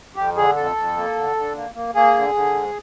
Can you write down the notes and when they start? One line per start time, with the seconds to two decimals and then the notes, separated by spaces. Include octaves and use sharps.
0.16 F2 G4
0.37 D3 G#4
0.56 F2 A4
0.76 F2
0.97 A#3
1.16 D3
1.36 D3
1.56 A#3
1.75 A#3
1.95 A#3 G#4
2.16 D3
2.35 D3
2.55 G#2